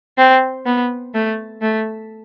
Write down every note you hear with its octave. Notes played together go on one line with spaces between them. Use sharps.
C4
B3
A3
A3